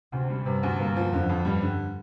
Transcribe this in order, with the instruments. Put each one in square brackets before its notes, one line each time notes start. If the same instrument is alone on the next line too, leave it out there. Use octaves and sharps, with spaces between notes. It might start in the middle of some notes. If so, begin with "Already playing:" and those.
[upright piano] D2 [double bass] C3
[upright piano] G3
[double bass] G2 [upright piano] C3
[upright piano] D2
[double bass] G2 [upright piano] A#3
[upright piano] F3
[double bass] F2 [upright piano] D3
[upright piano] F2
[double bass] G2 [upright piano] G3
[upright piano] D3